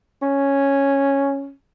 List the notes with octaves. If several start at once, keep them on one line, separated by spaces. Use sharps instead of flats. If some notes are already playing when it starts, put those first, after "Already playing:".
C#4